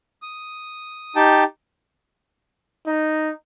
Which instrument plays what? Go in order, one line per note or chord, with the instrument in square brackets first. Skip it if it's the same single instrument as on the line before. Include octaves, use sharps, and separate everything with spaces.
[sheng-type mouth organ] D#6
D#4 G4 G5 A5
[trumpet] D#4